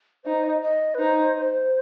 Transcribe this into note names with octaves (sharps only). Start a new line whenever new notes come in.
D#4 C5
D#5
D#5
B4
D#4 C5
C5